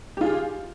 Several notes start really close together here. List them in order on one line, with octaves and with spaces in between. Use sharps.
G4 F4 G#4